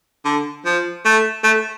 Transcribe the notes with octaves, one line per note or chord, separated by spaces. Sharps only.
D3
F3
A3
A3